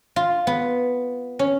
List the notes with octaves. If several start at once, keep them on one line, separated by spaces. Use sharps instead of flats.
F4
B3
C#4